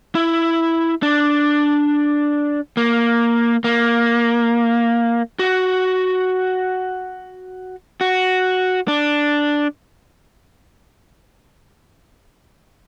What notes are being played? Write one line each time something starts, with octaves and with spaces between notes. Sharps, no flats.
E4
D4
A#3
A#3
F#4
F#4
D4